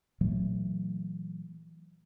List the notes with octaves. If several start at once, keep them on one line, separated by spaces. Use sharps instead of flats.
A#2 E3 F#3 A3